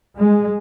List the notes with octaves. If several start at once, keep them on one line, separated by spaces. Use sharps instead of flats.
G#3